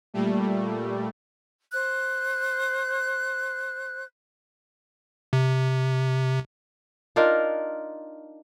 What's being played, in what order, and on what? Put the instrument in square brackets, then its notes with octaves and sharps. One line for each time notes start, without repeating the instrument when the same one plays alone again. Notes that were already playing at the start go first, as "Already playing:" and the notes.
[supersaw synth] A#2 G3 A3
[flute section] C5 F#6
[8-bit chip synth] C3
[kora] D4 D#4 F4 A#4